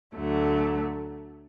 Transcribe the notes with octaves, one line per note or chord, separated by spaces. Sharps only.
D2 D3 F#3 A3